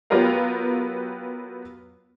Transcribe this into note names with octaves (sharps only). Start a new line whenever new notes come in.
F#3 B3 F4 G4 A#4 F5